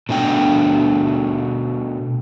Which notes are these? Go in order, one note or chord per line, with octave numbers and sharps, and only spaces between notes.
B2 A3 D4 G5